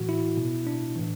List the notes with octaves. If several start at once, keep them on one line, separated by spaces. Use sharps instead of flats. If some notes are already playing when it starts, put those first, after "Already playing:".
Already playing: A2 E3 F#4
E4
B2
D4
A2 E3